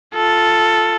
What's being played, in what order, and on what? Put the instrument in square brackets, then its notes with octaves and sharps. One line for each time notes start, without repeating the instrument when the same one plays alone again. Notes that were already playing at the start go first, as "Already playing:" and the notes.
[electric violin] F4 A4